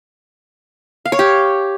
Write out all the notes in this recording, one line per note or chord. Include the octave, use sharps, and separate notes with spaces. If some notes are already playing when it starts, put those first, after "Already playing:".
F5
C#5
G4